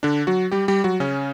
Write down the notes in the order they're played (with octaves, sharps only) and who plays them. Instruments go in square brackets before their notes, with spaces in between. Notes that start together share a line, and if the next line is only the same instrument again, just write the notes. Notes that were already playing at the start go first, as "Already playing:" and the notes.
[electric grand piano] D3 D4
F#3 F#4
G3 G4
G3 G4
F#3 F#4
C#3 C#4